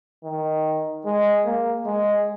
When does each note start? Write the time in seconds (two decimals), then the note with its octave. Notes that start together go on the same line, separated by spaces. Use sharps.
0.24 D#3
1.06 G#3
1.46 A#3
1.86 G#3